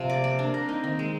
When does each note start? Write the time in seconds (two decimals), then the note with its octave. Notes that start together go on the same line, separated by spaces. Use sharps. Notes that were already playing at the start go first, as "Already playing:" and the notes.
Already playing: C3 F3
0.09 A#3 D5
0.24 D5
0.39 C4 D4
0.54 A#4
0.68 C4 D#4
0.84 D#3
0.99 G#3